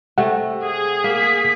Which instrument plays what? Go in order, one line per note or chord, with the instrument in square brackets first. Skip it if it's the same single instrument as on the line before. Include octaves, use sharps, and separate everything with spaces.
[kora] C3 A3 [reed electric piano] F#5
[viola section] G#4
[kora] A#3 [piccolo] B6